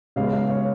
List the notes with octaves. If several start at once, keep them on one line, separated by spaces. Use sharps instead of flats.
C#3 G#3 B3 F5
F5
C#5